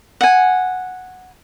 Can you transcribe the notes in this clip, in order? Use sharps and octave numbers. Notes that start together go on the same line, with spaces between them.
F#5 G#5